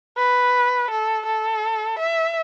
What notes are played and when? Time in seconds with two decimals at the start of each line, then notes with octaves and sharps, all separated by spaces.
0.17 B4
0.91 A4
1.26 A4
1.99 E5